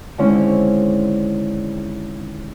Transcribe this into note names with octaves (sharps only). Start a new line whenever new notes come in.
D3 D#3 G#3 C4 C#4 E4